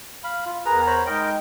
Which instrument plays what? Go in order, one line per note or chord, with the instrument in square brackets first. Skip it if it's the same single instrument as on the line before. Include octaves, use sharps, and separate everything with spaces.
[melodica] F5 B5
F4
[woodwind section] E2 A#4 A#5 [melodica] G#4 B4
[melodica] C5 C#5 B5
[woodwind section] G#3 D#4 G5 [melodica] A#4 D#5